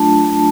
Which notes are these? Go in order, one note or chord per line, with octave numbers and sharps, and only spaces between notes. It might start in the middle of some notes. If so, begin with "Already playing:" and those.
Already playing: F#3 A3 D4 F4 A5
A5